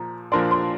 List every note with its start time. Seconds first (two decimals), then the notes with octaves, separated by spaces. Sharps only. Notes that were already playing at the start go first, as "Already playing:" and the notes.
Already playing: A#2 F3 A#5
0.32 A#2 F3 D4 A#4 D5 C6
0.51 C6